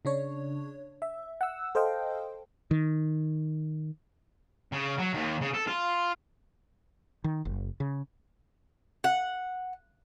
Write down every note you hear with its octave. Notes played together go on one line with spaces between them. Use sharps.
C#3 D4 C#5
E5
F#5 E6
A4 C5 D#5 F5 G5
D#3
C#3
F#3
D#2
C#3
A4
F4
D#3
F#1
C#3
F#5